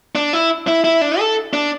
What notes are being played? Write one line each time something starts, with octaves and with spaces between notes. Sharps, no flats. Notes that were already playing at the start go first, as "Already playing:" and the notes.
D4
E4
E4
E4
D4
A4
D4